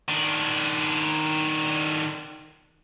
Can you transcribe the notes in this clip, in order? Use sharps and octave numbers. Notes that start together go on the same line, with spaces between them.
D#3 D4